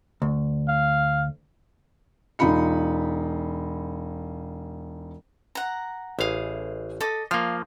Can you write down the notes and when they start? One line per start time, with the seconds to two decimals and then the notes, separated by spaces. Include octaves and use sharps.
0.22 D2
0.68 F5
2.39 E1 D#4 F4 B5 C#7
5.55 F#5 A#5
6.19 A1 E4 G#4 F5
7.00 A4 D#5 D6
7.31 F3 A#3 F5